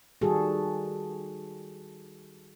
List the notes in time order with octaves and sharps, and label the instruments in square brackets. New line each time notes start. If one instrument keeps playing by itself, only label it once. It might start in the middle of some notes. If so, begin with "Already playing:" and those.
[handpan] D#3 G3 F#4 G#4 A4